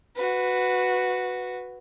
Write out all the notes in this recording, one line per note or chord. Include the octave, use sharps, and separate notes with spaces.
F#4 B4